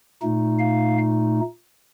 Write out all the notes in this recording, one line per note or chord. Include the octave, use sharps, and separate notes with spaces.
A#2 A3 D#4
F5